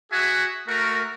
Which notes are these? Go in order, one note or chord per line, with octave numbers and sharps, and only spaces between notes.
F#4 G#4 E5 F#5 G#5
A3 F#4 A#4